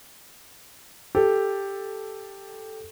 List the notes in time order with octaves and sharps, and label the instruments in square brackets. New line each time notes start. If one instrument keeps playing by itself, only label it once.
[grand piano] G4 [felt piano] A4